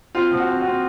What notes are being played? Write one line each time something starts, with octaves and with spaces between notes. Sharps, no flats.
C4 F4
F3
F#4
C4
F#4
C4